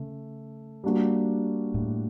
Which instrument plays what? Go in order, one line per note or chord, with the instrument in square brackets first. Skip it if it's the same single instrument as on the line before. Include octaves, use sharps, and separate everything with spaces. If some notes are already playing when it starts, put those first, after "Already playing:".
Already playing: [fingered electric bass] C#3 [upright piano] A3
[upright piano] G3 A#3 D4 F#4
[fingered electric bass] A2